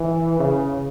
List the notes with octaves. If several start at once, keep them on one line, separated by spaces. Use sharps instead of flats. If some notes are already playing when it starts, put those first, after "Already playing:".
Already playing: E3
C#3